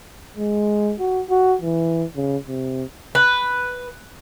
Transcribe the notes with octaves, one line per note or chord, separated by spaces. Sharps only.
G#3
F#4
F#4
E3
C#3
C3
B4